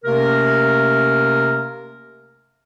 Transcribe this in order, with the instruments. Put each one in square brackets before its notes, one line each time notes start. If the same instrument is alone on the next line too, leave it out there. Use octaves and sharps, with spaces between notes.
[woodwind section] C3 A3 A#3 C#4 A#4